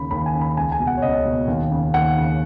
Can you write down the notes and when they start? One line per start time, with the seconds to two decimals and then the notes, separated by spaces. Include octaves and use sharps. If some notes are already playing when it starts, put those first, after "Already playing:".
Already playing: D#2 C#3 B5
0.11 D#2 B5
0.26 G#5
0.35 C#3
0.41 B5
0.57 C#2 G#5
0.72 G#5
0.80 B2
0.87 F#5
0.97 C#5
1.02 C#2 D#5
1.25 B2
1.48 D#2
1.71 C#3
1.94 D#2 F#5
2.17 C#3